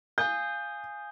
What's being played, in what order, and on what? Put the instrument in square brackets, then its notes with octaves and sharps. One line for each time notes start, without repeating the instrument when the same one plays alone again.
[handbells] F5 G#5 D#6 [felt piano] G6